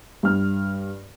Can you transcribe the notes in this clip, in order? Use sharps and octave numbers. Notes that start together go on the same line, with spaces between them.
G2 F6